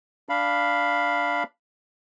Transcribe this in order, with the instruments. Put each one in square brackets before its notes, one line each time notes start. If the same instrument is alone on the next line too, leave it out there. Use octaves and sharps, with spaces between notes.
[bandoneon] D4 F5 B5